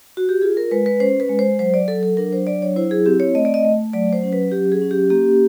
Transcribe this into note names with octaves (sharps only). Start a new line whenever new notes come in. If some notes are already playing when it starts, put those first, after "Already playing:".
F#4
G4
F4 G#4
A#4
G#3 B4
B4
C#4 C5
B4
G#3
C5
F#3 C5
D5
F#3 A4
A4
D4 A#4
C5
F#3 D5
C#5
E4 C5
G#4
C4 G4
C#5
A3 D#5
D5
D#5
A3
F#3 D5
C5
C#4
B4
F#3 G4
G#4
C#4
G4
A#3 G4